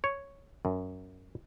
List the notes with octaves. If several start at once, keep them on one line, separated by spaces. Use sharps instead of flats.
C#5
F#2